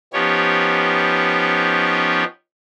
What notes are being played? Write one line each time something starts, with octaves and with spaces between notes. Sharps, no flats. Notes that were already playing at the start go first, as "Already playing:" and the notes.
F3 B3 C#4 D#4 G4 C#5